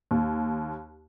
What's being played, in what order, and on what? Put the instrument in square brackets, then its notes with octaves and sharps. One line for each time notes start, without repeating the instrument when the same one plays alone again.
[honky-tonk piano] D#2